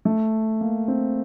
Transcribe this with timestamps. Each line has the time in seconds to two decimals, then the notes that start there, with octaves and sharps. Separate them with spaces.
0.05 A3
0.61 A#3
0.88 C4